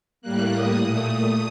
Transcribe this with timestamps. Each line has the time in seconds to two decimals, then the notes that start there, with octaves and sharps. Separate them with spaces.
0.22 A2 G3 A#3 F#6
0.52 D#6
0.81 A#2 A3 D#6